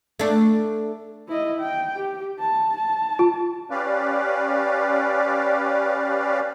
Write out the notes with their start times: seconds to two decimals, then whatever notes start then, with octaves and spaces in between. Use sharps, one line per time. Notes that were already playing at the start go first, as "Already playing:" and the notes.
0.19 A3 D4
1.28 E4 D#5
1.60 G5
1.95 G4
2.39 A5
2.77 A5
3.19 F4
3.71 C#4 G4 B4 D5 F5